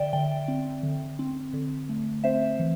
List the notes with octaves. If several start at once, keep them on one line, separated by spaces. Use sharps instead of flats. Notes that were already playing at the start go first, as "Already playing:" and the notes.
Already playing: D3 D5 E5 G5
D3 D5 G5
C4
D3
C4
D3
A3
C4 C5 E5
E3